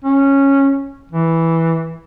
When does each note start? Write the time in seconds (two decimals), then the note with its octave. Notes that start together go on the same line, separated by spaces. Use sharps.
0.04 C#4
1.12 E3